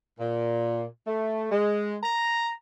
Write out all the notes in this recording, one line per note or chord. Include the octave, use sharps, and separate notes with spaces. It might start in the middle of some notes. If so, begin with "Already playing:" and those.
A#2
A3
G#3
A#5